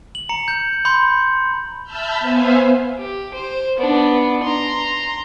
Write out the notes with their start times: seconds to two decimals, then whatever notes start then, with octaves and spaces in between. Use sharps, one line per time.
0.15 F#7
0.29 A#5 C#7
0.48 G6
0.85 B5 C6 G6
1.83 E5 A5 B5 E6 F6 G6
2.19 B3 C5 E5 F5 G#5
2.98 G4
3.34 C5
3.77 B3 D4
4.43 A#5 C6